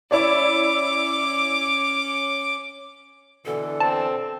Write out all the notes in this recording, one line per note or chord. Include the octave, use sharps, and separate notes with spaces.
C#4 E4 C#5 D5 D6
B2 D3 E3 A4
C4 A5